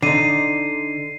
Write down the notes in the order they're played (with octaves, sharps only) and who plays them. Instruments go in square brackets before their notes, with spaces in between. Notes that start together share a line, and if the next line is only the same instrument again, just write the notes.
[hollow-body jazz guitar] D3 D#4 [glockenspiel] C7 D#7